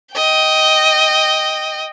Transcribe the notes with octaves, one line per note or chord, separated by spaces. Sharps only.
D#5 G5